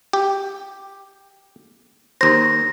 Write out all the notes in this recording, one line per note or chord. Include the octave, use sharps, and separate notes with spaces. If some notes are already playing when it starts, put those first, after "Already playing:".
G4
D#2 C5 A#6